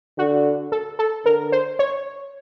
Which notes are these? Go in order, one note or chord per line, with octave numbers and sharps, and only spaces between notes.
D3 F#4
A4
A4
D3 A#4
C5
C#5